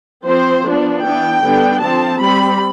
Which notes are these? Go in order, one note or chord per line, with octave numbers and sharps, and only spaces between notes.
F3 C4 C5
F3 B3 D4
E3 B3 D4 G5
D3 G3 B3 D4
F3 C4 A5
G3 C4 B5